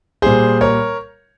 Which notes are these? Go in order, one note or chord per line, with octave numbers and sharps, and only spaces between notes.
A#2 G3 G#4 C5
A#4 C#5